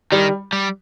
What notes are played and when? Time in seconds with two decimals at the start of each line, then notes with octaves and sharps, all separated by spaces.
0.12 D#3 G3
0.53 G3